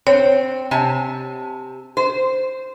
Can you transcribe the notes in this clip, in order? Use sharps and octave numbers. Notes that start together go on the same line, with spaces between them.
C4 C#5
C3 G#5 A5
C5